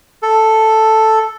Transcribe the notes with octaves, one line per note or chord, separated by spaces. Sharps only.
A4